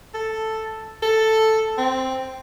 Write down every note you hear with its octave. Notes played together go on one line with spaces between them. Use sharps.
A4
A4
C4